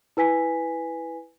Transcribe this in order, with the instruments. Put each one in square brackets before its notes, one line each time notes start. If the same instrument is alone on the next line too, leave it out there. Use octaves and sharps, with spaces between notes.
[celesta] E4 B4 G#5 B6